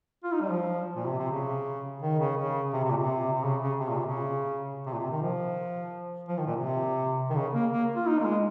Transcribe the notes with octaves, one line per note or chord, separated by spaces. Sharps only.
F4
D#4
G3
F3
A#2
C3
C3
C#3
D#3
C#3
C#3
C3
C3
A#2
C3
C3
C#3
C#3
C3
A#2
C3
C#3
C3
A#2
C3
D#3
F3
F3
D#3
A#2
C3
D#3
C#3
A#3
A#3
F4
D#4
A#3
G#3